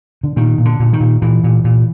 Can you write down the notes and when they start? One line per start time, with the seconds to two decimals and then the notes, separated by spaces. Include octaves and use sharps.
0.23 D3
0.36 A#2 D#3
0.58 A#2
0.65 D3
0.80 A#2
0.93 D#3
1.00 A#2
1.22 A#2 E3
1.44 A#2
1.64 A#2